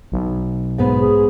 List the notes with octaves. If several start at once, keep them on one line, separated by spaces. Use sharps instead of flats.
B1
G#2 G#3 B3
G#4